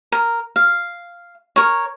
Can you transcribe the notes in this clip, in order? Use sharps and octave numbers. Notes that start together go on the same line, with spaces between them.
A#4
F5
A#4 C#5